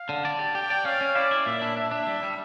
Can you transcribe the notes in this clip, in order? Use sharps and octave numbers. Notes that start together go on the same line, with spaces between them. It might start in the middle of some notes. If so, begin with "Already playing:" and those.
Already playing: F5
D3
D5 A5
G4
G4 G5
D5
C#4 F5
C#4
E4 D5
E4
A#2 E5
D4
D4 E5
D4
G3
G3